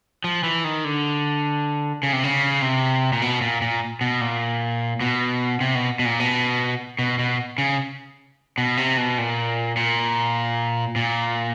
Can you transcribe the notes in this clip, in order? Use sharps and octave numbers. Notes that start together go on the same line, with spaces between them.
F3
E3
D#3
D3
C#3
C3
C#3
C3
A#2
B2
A#2
A#2
B2
A#2
B2
C3
B2
B2
A#2
B2
B2
B2
C#3
B2
C3
B2
A#2
A#2
A#2